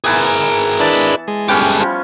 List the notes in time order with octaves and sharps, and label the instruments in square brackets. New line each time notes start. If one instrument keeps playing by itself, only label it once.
[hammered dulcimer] E3 B3 G#5 [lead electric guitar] G#4 A#4
[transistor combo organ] D4 E4 B4 [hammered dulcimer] A5
[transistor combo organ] G#3
[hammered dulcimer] G3 B3 C#4 [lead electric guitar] G4 A4
[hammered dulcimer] F3